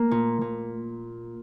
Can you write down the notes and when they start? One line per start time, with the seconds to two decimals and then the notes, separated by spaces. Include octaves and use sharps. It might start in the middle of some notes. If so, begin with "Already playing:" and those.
Already playing: A#3 A#4
0.11 A#2
0.41 A#2